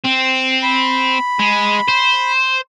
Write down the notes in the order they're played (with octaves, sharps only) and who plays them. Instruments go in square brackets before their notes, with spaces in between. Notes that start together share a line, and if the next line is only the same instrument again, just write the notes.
[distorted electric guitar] C4
[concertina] B5
[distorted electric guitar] G#3
C5